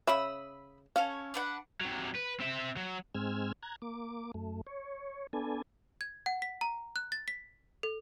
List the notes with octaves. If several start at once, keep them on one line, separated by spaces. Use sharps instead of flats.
C#3 E5 B5 D#6 E6
C#4 A4 C#5 F5
D4 B4 F#5
C3 F#3
B4
C4 E5
F#3
G#2 G#3 C4 E6 F6 G#6
A#5 F#6 G#6
A#3 D6
F#2 A3
C#5
B3 D4 A4 G#5
G#6
F#5
B6
A#5
F#6
A6
B6
A4